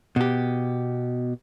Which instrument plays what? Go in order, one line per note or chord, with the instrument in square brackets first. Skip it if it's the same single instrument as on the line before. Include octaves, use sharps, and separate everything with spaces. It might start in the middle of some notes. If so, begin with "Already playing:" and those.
[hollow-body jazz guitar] B2 G4